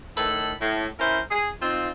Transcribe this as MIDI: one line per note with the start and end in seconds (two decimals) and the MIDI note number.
0.17 0.53 45
0.17 0.53 51
0.17 0.53 69
0.17 0.53 83
0.60 0.86 45
0.99 1.20 61
0.99 1.20 64
0.99 1.20 70
0.99 1.20 72
1.31 1.50 68
1.61 1.90 60
1.61 1.90 63
1.61 1.90 65